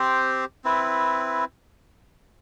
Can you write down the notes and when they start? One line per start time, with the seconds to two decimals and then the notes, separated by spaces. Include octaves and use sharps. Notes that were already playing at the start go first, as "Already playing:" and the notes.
Already playing: C4 G4 C5
0.64 C4 E4 B4